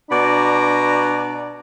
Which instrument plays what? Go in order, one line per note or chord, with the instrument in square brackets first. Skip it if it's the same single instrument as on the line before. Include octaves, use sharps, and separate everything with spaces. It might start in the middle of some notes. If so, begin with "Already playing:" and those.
[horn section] B2 D4 F#4 D5 A#5